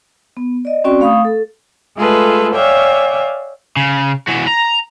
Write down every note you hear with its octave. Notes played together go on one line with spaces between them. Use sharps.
B3
D5 D#5
C4 C#4 F#4 D5 G5 C#6
A3 F5 B5 C#6 D#6
A4
G#3 A3 F4 G#4 A4 B4
C#5 D5 E5 F5 G5 G#5
C#3
E3 F#4
A#5